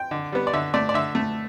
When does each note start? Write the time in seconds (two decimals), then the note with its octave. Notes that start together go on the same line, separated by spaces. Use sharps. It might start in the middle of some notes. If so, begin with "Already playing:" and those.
Already playing: G5
0.11 D3
0.33 G3 B3
0.47 D5
0.53 D3 E5
0.74 A3 D5
0.89 D5
0.94 D3 E5
1.15 A3